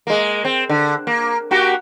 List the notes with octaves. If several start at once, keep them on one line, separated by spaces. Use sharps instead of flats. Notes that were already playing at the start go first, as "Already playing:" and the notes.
G#3 A#3
C4
D3
A#3
A#3 F#4 G4